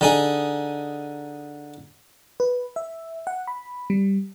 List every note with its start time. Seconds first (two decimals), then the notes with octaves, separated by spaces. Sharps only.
0.01 D3 D#4 G#4
2.40 B4
2.76 E5
3.27 F#5
3.47 B5
3.90 G3